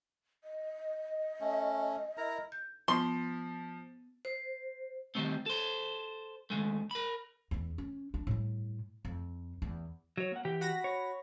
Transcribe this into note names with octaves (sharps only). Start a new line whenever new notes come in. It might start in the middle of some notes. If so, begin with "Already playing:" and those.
D#5
A3 C#4
E4 A#4 A#5
G6
F3 B3 C6
C5
D#3 G3 A3 C4
A4 C5
D#2 A#2 G#3 A3
A#4 B5
E2 E3
C#4
D4
A2 G3
F2
E2
F#3 C#5
A#3 F#5
E3 G4 G5
F#4 B5 A#6
C#5